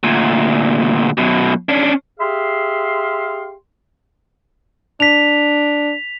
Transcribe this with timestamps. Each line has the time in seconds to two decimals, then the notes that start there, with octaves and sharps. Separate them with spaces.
0.04 D2 A#2
1.18 F#2 B2
1.69 C#4 D4
2.20 G4 G#4 E5 F5 C6
5.00 D4 B6 F7